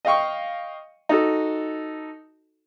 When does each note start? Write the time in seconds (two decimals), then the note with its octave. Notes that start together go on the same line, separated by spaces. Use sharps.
0.05 D#5 F5 G5 C#6
1.09 D#4 F#4 A4